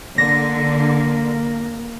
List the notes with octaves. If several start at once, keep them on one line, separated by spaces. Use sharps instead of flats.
D3 A#3 A#6